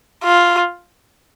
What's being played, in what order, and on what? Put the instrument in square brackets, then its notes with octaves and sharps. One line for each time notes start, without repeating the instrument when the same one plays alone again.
[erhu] F4